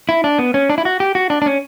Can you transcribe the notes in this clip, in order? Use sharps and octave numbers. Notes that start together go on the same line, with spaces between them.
E4
D4
B3
C#4
D4
E4
F#4
G4
F#4
D4
D4
C#4